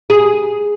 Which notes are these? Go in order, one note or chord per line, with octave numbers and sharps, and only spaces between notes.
G#4